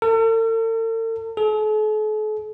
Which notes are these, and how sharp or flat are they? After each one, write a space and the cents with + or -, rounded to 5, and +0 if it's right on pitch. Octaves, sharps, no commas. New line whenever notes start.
A4 +45
A4 -45